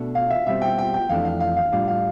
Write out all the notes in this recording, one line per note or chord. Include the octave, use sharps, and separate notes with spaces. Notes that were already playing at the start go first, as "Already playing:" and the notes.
Already playing: B2 A3 D4
F5
E5
B2 G3 C4 E5
G5
G5
G5
F2 E3 A3 D4 F5
F5
F5
F5
A2 G3 D4 F4 F5
F5